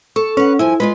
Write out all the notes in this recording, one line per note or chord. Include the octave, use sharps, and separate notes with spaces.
A4 C#6
C#4 B4 F#5
G2 F3 E4 G#5
G#3 F4 B4 D5